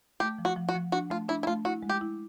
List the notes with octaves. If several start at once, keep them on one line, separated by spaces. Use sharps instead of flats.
A3 G4
F3
F#4
F3
F#4
F3
D4 F#4
A3 F4
D4 E4
E4
A3 F4
E4 F#4
G#3
G4
E4